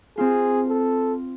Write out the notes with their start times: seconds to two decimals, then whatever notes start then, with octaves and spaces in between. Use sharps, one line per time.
0.18 C4 F4 G#4
0.69 A4